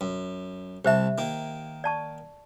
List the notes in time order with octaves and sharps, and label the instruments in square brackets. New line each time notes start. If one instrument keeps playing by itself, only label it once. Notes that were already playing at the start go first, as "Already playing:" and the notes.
[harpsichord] F#2
[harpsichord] C2 A5 [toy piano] G4 C5 E5
[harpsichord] D#3 A#3
[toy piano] D5 A5 C#6